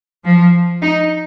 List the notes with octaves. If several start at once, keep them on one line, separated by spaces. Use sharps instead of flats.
F3
D#4